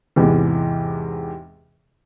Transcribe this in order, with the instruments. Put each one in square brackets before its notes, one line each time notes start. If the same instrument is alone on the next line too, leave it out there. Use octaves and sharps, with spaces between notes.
[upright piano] E2 G#2 C3 E3